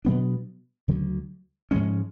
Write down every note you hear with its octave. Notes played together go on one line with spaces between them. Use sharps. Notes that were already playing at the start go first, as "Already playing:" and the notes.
B2 F#3 B3 D4
D2 C#3 F#3
G#2 F3 G#3 C#4